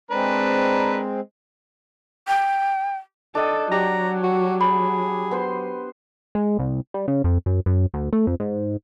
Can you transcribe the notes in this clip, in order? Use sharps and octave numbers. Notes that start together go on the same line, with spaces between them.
G#3 C4 D4 A#4 B4
G5
D4 A4 D#5 G5
F#3 G4 D5 F#5 A#5
F#4
G#4 B5
B3 C5 C6
G#3
C2
G3
C#3
F2
F#2
F#2
D2
A3
F2
G#2